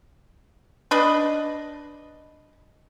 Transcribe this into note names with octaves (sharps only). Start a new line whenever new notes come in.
D4 B4 D#5